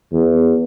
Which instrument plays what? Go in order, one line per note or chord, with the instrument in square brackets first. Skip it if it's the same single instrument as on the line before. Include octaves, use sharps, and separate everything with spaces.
[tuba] E2